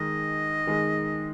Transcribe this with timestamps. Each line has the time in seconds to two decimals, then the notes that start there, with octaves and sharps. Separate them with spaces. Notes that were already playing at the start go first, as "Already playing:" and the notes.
Already playing: D#3 G#3 D#4 G#4 D#5
0.67 D#3 G#3 D#4 G#4